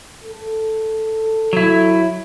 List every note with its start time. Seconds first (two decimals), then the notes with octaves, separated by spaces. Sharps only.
0.24 A4
1.53 F#3 E4